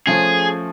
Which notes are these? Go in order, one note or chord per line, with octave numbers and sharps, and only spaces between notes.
F3 A3 C#4 G#4